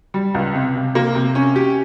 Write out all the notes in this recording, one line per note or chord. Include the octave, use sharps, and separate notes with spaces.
G3
C#2
C3
C3
A#3
C3
C#4
G4